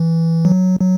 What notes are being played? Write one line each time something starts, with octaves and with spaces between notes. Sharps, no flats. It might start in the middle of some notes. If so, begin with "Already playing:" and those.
Already playing: E3
F#3
F#3